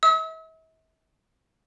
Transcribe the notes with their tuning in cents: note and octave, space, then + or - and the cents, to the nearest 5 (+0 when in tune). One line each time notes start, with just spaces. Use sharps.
E5 -40 E6 -45